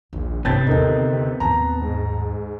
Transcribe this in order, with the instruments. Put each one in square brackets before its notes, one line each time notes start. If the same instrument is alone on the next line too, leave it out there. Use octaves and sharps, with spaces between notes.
[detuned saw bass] A#1 [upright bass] D#2
[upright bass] A2 D4 [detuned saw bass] C3 [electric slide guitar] B3 C4 [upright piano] A5 G6 A6
[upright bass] D#2 D3 [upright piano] D#4 A4 A#4
[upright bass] D#2 A2 [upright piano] A5 A#5
[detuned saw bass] G#2